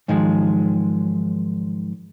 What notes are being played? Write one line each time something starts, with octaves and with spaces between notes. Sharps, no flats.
G#2 D#3 F3 F#3 G#3